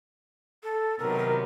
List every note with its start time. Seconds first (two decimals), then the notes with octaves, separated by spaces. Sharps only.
0.63 A4
0.99 C3 D#3 F#3 B3 A#4